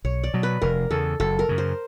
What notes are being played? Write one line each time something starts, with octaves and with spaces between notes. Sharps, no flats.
B1 C#5
D5
B2 F#3
B4
F1 A#4
E2 C#3 A4
F#1 A4
A#4
F#2 C#3
C5